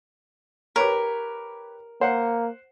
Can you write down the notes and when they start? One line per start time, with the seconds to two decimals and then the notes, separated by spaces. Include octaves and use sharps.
0.76 G4 A#4 B4 C#5
2.01 A#3 C5 F#5